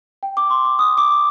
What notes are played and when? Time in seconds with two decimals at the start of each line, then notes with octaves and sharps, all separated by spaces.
0.23 G5
0.37 D6
0.50 C6
0.65 D6
0.79 D#6
0.98 D6